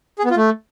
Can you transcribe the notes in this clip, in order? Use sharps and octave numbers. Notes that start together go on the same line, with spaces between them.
G#4
B3
F4
A3